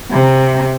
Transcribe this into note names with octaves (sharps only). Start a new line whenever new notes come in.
C3